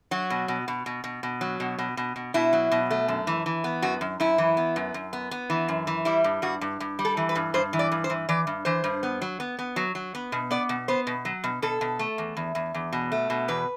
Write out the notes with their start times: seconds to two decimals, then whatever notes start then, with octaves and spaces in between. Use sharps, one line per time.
0.11 F#3 F#4
0.30 B2
0.48 B2
0.68 B2
0.86 B2
1.04 B2
1.23 B2
1.41 F#3
1.60 B2
1.79 B2
1.97 B2
2.16 B2
2.34 B2 E4
2.53 F#3
2.72 B2
2.91 A3
3.08 F#2
3.27 E3
3.46 E3
3.64 B3
3.82 F#2 F#4
4.01 F#2
4.20 F#2 E4
4.38 E3
4.57 B3
4.76 F#2
4.94 F#2
5.13 B3
5.31 B3
5.50 E3
5.68 F#2
5.87 E3
6.05 G3 E4
6.24 G2
6.42 G2 F#4
6.61 G2
6.80 G2
6.99 G3
7.05 A4
7.17 E3
7.29 B4
7.35 G2
7.54 G2 C5
7.73 E3
7.79 D5
7.92 G2
8.04 C5
8.10 E3
8.29 E3 D5
8.47 G2
8.65 E3 C5
8.84 G2
9.03 B3
9.21 F#3
9.40 B3
9.59 B3
9.76 F#3
9.95 F#3
10.15 B3
10.32 B2
10.51 B3 D5
10.69 B2
10.88 B3 C5
11.07 B2
11.25 F#3
11.44 B2
11.62 B2 A4
11.81 B2
11.99 A3
12.18 E2
12.37 E2
12.55 E2
12.74 E2
12.93 B2
13.12 A3
13.30 B2
13.48 E2 B4